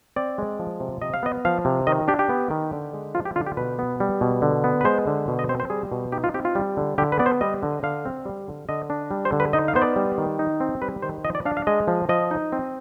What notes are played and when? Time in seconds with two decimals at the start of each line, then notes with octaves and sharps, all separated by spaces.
0.16 C4 D5
0.38 G#3
0.59 F3
0.80 C3
1.02 C3 D#5
1.14 F5
1.23 B3 D#5
1.45 F3 F5
1.65 C3
1.87 D#3 D#5
2.08 D4 G4
2.19 G4
2.29 B3
2.51 D#3
2.73 D3
2.94 G#3
3.14 F3 F4
3.25 G4
3.36 D3 F4
3.46 G4
3.57 B2 B4
3.79 B3
4.00 G3
4.21 B2
4.42 D3
4.64 B3
4.81 B4
4.85 G#3 C5
5.07 D3
5.28 B2
5.39 D#5
5.49 C4 C5
5.60 C5
5.70 G3 G#4
5.92 B2
6.12 D#4 G4
6.24 F4
6.34 C4 G4
6.45 F4
6.55 G3
6.77 D3
6.98 D3 G4
7.12 B4
7.19 B3 D5
7.26 C5
7.41 G3 D#5
7.63 D3
7.83 D3 F5
8.05 C4
8.26 G3
8.48 D3
8.69 D3 D#5
8.90 D4
9.11 G3
9.25 C5
9.32 D3
9.40 B4
9.53 D#4 D#5
9.68 F5
9.75 B3 C5
9.82 D5
9.96 G3
10.18 D#3
10.39 D#4
10.60 C4
10.82 G3 B4
11.02 D#3 C5
11.25 F3 D#5
11.35 D5
11.45 D4 F5
11.57 F5
11.67 G#3 D#5
11.88 F3
12.09 F3 D#5
12.31 D#4
12.52 C4